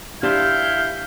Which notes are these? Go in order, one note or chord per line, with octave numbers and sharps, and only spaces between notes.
D4 E4 G4 C5 F5 G6